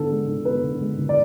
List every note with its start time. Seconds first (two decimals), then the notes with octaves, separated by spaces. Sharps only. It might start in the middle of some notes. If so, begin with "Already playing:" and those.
Already playing: D3 B3 A4
0.11 G#3
0.28 D3
0.45 B3 B4
0.64 D3
0.81 G#3
0.98 D3
1.09 D5